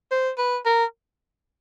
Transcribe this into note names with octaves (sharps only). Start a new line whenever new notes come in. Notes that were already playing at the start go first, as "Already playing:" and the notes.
C5
B4
A#4